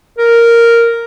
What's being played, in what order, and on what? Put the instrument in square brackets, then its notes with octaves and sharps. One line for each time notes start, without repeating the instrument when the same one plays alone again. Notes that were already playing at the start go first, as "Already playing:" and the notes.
[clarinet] A#4